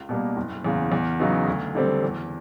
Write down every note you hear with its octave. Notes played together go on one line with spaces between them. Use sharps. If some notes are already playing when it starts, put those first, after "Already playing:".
Already playing: C#2
B2 G3 A#3
F#1
E2 C#3
E2
C#3 F#3 B3 D#4
D2
D3 G3 C4
E2